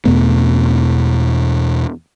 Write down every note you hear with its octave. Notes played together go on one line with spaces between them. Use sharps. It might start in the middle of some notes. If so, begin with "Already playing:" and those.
E2 B2 A3 B3